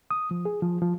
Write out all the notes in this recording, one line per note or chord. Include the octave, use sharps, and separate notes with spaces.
D#6
F3
G#4
F3
F3